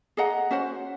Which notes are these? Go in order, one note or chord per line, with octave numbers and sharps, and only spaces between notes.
G#4 D#5 F#5 A#5
C#4 F#4 C5 F#5